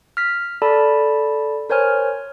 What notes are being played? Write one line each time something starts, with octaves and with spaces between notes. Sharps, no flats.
F6 B6
A4 D5 A5 B5
A#4 C5 C#5 G#5 F6